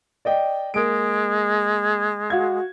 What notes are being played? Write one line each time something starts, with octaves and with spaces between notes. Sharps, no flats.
D5 D#5 G5
G#3 A#3 D7
F#4 F5 G#6